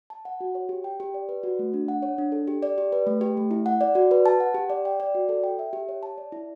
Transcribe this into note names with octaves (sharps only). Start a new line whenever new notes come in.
A5
F#5
F#4
C#5
G4
G5
G4
D5
B4
F#4
A3
D4
F#5
C#5
D4
A4
G4
D5
G4
B4
A3
G4
A3
E4
F#5
D5
F#4
B4
A5
F#5
G4
D5
G5
D5
F#4
A4
G5
E5
G4
C#5
A5
D5
E4